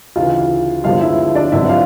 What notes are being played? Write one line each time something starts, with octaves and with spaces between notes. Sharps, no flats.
D2 C#3 E3 F4 F5
G1 G2 D3 F3 G#3 F4 F5
E4 E5
D4 D5
G#1 G2 D3 F#3 E4 E5
F4 F5